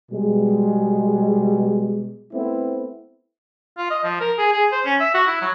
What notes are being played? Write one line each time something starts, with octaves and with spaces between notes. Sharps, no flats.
B2 G3 G#3
A3 B3 C4 E4
F4
D#5
F3
A#4
G#4
G#4
C5
C#4
E5
F#4
E4
F#3